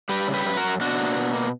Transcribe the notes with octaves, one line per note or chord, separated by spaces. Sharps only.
G3 G4 B4
C#3
G4 B4
F#2 B4
F#4 A#4
F#2
B2 D4 F#4
A#3
B2
A#3